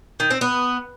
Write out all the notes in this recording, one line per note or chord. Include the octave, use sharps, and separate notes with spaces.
D#3
C4
B3